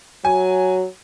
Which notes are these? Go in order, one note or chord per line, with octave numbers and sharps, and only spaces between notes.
F#3 G#5